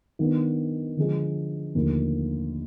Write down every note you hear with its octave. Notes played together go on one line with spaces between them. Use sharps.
D#3 F#3 B3 D4
D3 F3 G#3
D#2 D3 F3 A3